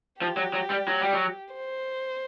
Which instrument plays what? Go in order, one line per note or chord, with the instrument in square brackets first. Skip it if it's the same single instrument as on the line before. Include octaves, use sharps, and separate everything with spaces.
[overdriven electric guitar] F3 [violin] G4
[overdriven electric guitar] F#3
F#3
G3
F#3
G3
F#3
[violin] C5